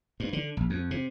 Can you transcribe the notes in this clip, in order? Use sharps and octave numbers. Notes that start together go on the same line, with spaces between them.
G2
D3
A#1
F2
C3